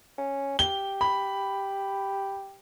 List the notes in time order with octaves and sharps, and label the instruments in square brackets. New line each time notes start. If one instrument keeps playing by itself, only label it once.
[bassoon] C#4
[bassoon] G4 [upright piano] G7
[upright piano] B5